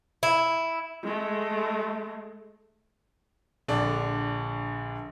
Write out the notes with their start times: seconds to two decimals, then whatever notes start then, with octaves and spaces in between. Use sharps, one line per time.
0.23 E4
1.03 G#3 A3
3.68 A#1 D3 D4